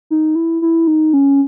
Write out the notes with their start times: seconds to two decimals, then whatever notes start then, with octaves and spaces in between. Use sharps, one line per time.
0.10 D#4
0.35 E4
0.62 E4
0.87 D#4
1.13 C#4